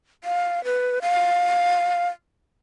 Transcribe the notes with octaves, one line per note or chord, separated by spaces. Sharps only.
F5
B4
F5